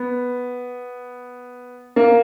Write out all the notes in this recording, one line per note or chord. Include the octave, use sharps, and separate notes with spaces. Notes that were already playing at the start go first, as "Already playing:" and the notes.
Already playing: B3
A#3